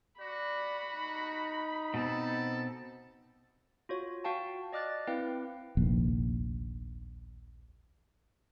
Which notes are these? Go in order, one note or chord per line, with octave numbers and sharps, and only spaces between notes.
F#4 D5 B5
D#4
B2 C4 A4
F4 F#4 C#5
F#4 F5 G5 A5
D5 D#5 D6 F6 F#6 A6
C4 E4 B4 F5 G5
F1 A#1 D#2